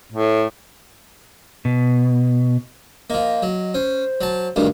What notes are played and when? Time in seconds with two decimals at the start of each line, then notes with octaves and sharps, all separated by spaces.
0.13 A2
1.65 B2
3.10 F3 A#3 D#5
3.43 F#3
3.74 C#4 C5
4.21 F#3 A5
4.56 D2 G2 D#3 G4